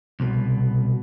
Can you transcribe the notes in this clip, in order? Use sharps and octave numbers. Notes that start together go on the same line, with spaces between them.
C2 B2